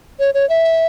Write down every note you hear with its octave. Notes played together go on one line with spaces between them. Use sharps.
C#5
C#5
E5